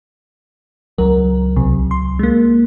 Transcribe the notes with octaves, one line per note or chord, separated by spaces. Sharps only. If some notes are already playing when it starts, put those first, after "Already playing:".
C#2 F#3 A#4
B1 C3
C6
G#3 A#3